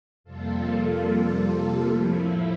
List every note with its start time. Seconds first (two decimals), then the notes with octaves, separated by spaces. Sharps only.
0.24 F2 C3 G3 A#3 F4 A4
1.86 A2 F3 A3 E4